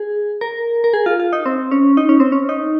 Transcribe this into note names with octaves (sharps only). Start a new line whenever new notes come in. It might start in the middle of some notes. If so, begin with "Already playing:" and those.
Already playing: G#4
A#4
A#4
G#4
F4
F4
D#4
C4
C#4
D#4
C#4
C4
C#4
D#4